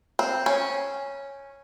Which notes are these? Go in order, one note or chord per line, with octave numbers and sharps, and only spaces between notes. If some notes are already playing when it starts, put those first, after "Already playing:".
C4
C#4